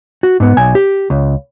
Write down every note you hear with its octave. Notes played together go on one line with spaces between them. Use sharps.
F#4
G#2 B3
B1 G#5
G4
C#2